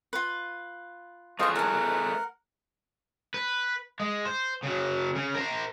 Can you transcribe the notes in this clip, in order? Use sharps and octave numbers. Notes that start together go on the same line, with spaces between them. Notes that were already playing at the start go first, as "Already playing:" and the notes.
F4 B4
A3 F4 G#4 B4 C5 D#5 F5 C#6
A#4 F#5 G#5 A5
B4
G#3
C5
C#3 F#3
C#3
A#4 C5